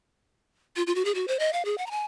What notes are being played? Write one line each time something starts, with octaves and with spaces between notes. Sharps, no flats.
F4
F4
F#4
G#4
F#4
C5
D#5
F5
G#4
F#5
A#5
G#5